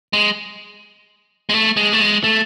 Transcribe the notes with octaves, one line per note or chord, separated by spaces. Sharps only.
G#3
G#3
A3
G#3
A3
G#3
A3